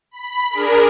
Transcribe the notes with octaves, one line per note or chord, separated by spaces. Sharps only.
B5
D4 G#4 A#4